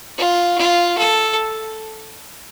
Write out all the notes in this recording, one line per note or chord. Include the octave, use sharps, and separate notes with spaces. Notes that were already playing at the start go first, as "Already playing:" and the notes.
F4
F4
A4